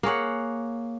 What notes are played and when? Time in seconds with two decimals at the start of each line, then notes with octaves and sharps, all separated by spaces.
0.03 A#3 G#4 C#5 F#5